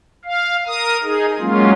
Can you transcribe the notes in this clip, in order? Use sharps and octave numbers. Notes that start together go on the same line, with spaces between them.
F5
A#4 D#6
D#4 G#4
F#3 G#3 A#3 C#4 F4